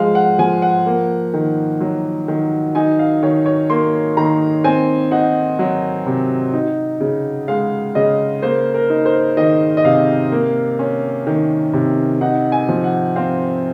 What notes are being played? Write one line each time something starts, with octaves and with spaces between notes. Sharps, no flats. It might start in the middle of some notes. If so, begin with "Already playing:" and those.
Already playing: F3 G#3 F5
F#5
F3 G#5
F#5
A#3
D#3
F#3
D#3
D#4 G#5
F5
D#3 C#5
C#5
A#3 C6
D#3 A#5
C4 G#5
D#4 F#5
F#3 F#5
C3
D#4
C#3
G#3 F5
C#3 D#5
A#3 C5
A#4
D#4
C5
D#3 D#5
D#5
C3 F5
A#3
C#4
D#3
C3
D#4 F#5
G#5
F3
F#5
C4 F5